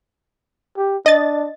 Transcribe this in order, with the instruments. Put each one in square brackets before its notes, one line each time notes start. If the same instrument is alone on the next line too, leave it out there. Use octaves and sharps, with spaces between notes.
[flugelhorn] G4
[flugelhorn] D4 [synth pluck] D#5 A6